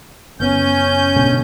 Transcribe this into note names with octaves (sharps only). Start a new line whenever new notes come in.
F#1 B3 C#4 G6
G#2 B2 D3